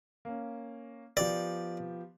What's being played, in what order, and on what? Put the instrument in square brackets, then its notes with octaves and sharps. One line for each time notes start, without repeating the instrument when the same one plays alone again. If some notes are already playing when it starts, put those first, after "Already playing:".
[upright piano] A#3 C#4
[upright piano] F3 B3 G4 [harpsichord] D5